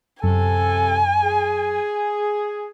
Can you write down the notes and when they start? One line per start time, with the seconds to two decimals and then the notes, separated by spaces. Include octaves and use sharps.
0.23 F#2 C3 A4 G#5
1.24 G#4